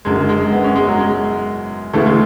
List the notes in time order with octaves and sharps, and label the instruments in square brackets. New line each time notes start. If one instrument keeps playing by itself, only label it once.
[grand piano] F#1 F#2 D3 G#3
G#3
B3
C#4
G#3
F#3
G#3
D2 C#3 E3 A3
G#3